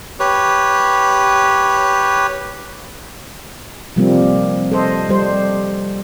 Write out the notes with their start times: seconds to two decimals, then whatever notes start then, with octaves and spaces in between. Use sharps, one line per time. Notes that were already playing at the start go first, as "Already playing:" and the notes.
0.20 G4 B4 C#5
3.96 C3 F3 G3 A#3 C4
4.72 A4 C5 D#5
5.09 G3 C5